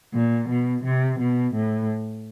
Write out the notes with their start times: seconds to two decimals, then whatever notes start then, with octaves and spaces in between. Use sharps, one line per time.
0.13 A#2
0.49 B2
0.84 C3
1.19 B2
1.54 A2